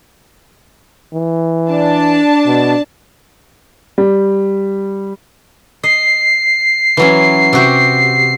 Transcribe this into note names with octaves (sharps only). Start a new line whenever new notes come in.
E3
D4 A5
B2
G3
D#5 C7
E3 F#3 C#4
C3 F#4 G4